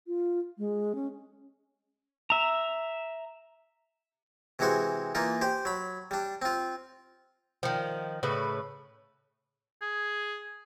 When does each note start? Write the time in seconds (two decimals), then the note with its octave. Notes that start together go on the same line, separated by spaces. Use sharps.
0.07 F4
0.58 G#3
0.95 C#4
2.30 E5 A#5
4.59 C3 E3 G#3 F#4 C5
5.15 E3 A#3 D#4 F4
5.42 G4 C5
5.65 F#3 B5
6.11 G3 D4
6.42 C4 F4
7.63 D#3 F3
8.23 A2 C#3 B4
9.82 G#4